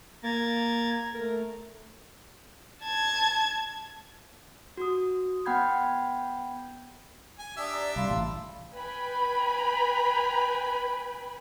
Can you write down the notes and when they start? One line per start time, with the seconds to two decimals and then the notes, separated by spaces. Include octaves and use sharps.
0.24 A#3 A#5 G#6 A6
1.15 A3 A#4
2.82 A5 G#6
4.77 F#4 D#6
5.46 B3 F#5 G5 B5 G6 G#6
7.39 G#5
7.57 D4 G4 D5 E5 D#6
7.71 D5 A#5
7.96 C2 F5 B5 C6
8.10 A1
8.73 B4 G5 G#5 B5